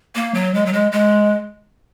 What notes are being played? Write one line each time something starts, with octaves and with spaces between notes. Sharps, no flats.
A#3
F#3
G#3
F#3
G#3
G#3